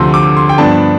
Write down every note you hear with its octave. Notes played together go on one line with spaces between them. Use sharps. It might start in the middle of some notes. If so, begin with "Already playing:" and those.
Already playing: D2 C3 F3 A3 C6
D6
C6
G5
G2 F3 B3 D4 A5